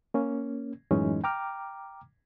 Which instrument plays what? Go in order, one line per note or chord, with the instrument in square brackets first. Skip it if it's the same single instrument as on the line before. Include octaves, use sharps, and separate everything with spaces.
[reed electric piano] A#3 C#4
F#2 A2 E3 G#3 C#4 D#4
G5 A#5 D6 F6